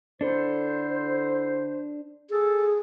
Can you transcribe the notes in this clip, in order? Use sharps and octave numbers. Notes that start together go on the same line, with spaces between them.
D3 D4 E4 A4 C5
G#4 A4